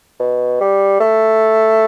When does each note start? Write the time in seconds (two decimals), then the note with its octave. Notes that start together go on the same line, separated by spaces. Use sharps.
0.20 B2
0.60 G3
1.00 A3